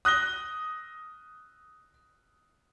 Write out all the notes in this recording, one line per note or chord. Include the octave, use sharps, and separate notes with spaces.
D#6 F#6 A#6 G7